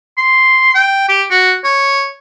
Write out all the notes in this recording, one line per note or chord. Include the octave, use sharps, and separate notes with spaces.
C6
G5
G4
F#4
C#5